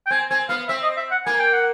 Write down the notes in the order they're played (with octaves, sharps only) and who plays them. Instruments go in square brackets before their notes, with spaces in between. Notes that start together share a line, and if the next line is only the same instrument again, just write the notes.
[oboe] G5
[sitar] C4 [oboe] G#5
[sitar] C4 [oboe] G#5
[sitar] B3 [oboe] F5
[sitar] C4 [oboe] E5
[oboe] D#5
E5
F#5
[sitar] A#3 [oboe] G#5
[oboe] G5
F#5